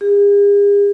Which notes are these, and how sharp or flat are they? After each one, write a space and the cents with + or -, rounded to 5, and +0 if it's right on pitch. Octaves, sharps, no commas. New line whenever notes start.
G#4 -45